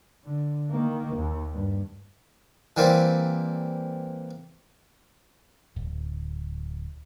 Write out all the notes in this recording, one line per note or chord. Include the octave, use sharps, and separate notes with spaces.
D3
D#3 A#3
D#2
G2
E3 G3 A#3 C4
D1